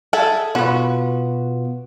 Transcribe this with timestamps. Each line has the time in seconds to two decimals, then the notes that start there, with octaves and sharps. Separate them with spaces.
0.13 G#4 A4 E5
0.55 B2 B3 F4 F#4 B4